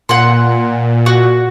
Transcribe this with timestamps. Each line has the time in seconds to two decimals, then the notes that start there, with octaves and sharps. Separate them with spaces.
0.09 A#2 F#5 C6
1.06 F#4